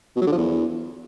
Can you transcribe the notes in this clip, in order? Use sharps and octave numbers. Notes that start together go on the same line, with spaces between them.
B2
F#3
D3
F3
E2